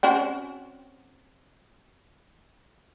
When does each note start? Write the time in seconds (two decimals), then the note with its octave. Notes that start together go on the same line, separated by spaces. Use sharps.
0.03 C4 C#4 F#4